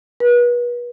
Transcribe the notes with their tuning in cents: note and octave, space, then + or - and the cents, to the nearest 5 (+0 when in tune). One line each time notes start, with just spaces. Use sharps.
B4 -35